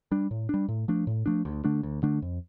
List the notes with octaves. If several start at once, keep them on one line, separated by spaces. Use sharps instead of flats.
G3 D4
A2
G3 D4
A2
F3 A3 D4
A2
F3 A3 D4
D2
D3 A3 D4
D2
D3 A3 D4
F2